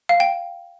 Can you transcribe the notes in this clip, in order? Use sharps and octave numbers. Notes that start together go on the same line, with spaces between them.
F5
G5